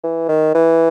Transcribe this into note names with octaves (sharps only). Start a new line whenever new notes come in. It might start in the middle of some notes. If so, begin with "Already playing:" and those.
E3
D#3
E3